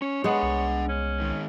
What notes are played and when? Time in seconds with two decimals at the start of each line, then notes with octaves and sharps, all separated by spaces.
0.02 C#4 C#5
0.24 G#3 B3 D4 F#5
0.43 C2
0.89 C#4
1.20 G#2 D#3